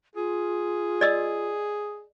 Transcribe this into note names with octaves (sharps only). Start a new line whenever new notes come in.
F4 G#4
D5 D#5 E6